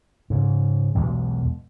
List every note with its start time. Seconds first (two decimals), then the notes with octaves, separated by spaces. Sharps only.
0.30 G#2 C#3
0.95 B1 E2 B2 G#3